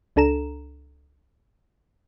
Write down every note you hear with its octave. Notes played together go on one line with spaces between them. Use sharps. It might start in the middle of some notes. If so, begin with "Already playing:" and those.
C#2 D4 A4 A#5 E7